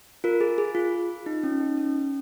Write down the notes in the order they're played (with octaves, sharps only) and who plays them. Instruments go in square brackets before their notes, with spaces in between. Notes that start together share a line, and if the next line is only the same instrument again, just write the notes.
[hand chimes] F4 A#4
G#4
G#4
F4
D#4
C#4
D#4
C#4